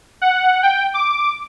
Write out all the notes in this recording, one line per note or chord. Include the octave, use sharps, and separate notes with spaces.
F#5
G5
D6